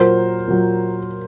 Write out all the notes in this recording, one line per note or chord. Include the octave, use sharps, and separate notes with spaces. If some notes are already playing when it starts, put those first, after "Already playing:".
Already playing: A#2 F#3 A#4 C5
A#2 F#3